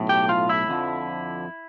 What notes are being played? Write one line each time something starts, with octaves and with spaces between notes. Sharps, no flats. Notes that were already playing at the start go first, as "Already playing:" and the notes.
Already playing: B1 A2
G4 G5
F4 F5
E4 E5
F2 D3 F3